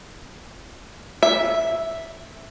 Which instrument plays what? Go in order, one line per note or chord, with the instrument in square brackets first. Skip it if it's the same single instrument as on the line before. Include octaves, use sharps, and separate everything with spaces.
[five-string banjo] E5